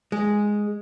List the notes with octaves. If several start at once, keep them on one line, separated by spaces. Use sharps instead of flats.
G#3